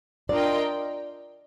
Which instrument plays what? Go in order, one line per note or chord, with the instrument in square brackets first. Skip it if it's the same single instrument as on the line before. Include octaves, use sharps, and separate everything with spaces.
[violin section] D4 F4 A#4 D#5 G5 [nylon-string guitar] D5